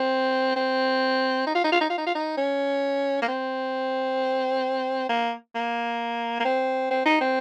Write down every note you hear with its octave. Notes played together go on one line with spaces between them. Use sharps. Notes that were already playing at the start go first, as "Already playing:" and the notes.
Already playing: C4
C4
D#4
F4
D#4
F4
D#4
F4
D#4
F4
D#4
C#4
A#3
C4
A#3
A#3
A#3
C4
C4
D#4
C4